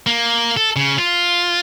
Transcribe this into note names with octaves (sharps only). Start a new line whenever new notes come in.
A#3
A4
C#3
F4